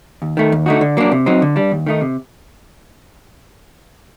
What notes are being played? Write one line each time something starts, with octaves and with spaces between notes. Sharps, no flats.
D#2
D#3 A3
D#2
D3 A3 D#4 F#4
D3
F#3 A#3 D4
C3
F#3 C4 D#4
D3
G3 D4
D#2
D#3 A3 D#4
C3